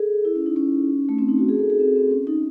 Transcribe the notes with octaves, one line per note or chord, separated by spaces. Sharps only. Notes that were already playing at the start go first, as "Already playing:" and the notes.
Already playing: G#4 A4
E4
C#4
D#4
C#4
A3
C4
D#4
F#4
G#4
A4
G#4
C4
C4
C#4
D#4